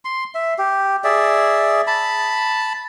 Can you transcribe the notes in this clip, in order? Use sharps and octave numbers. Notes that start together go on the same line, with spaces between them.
C6
E5
G4
G#4 D5 E5
A5 B5